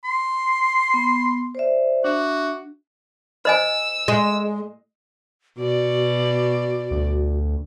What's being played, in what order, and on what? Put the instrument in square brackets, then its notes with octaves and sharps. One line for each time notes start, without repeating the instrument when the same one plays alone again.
[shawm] C6
[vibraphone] B3
C5 D5 E5
[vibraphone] D4 E5 [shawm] F#4
[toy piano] C5 D#5 G#5 [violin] E6
[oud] G#3
[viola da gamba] B2 D5 [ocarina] F#4
[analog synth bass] D2